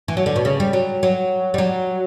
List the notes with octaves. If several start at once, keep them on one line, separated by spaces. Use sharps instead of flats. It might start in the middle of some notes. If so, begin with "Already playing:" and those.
E3
F#3
D3
B2
C#3
G3
F#3
F#3
G3
F#3